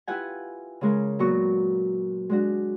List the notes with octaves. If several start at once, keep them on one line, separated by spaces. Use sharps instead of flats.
E4 F4 G4 B4 F#5 G#5
C#3 G#3 A#4
A#2 F#3 B3 F#4 C#6
G#3 D4 F#4